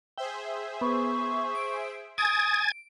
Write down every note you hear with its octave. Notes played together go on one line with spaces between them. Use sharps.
G#4 C5 E5 G5
B3 C#6
D7
G#5 D#6 G#6 A6 D7